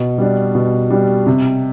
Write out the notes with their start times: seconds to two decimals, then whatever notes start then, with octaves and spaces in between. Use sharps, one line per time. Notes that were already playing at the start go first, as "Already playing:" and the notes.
Already playing: B2
0.18 G3 D4
0.55 B2
0.90 G3 D4
1.27 C3